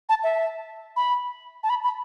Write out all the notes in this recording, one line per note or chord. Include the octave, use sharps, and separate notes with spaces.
A5
E5
B5
A5
B5
B5